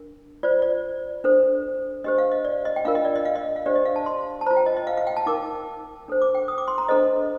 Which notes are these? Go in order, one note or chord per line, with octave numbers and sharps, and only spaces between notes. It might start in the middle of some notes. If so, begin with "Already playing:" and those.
Already playing: D4 A#4
F4 C5 D5
D5
D4 A4 C5
D4 G4 C5 D#5
F5
D#5
D5
D#5
G5
D4 F4 A#4 F5
D#5
D5
D#5
F5
D#5
F5
D4 G4 C5 D5
D#5
F5
A5
C6
A5
F4 C5 A#5
G5
D#5
D#5
F5
F5
G5
A5
D#4 A#4 D6
D4 A4 C5
D6
G5
D#6
D6
C6
A#5
D4 A4 C5 D#5